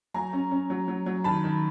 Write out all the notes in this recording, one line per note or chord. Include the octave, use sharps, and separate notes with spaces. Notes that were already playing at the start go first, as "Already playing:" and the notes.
F#3 G#5 A#5
C#4
C#4
F#3
F#3
F#3
D#3 A5 B5
D#3